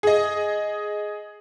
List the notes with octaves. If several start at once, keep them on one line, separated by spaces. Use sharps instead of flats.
G#4 D#5